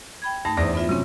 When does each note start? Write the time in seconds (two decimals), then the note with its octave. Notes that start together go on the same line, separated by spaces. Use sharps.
0.22 G5 B5 G#6
0.45 G2 A3 D#4 A5
0.57 E2 D4 C5 D5 A#6
0.75 B3 F4 E5
0.89 C3 F#3 C4 C#4